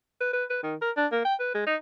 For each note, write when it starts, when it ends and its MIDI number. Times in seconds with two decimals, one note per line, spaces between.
0.20 0.31 71
0.33 0.44 71
0.50 0.59 71
0.63 0.75 51
0.82 0.91 70
0.97 1.06 62
1.12 1.25 58
1.25 1.34 79
1.39 1.53 71
1.54 1.64 56
1.67 1.76 63